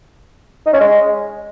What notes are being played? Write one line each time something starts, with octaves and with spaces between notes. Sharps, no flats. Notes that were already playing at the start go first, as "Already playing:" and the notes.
D#4
C#4
G#3